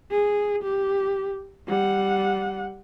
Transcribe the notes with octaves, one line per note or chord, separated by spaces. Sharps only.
G#4
G4
G3 F#5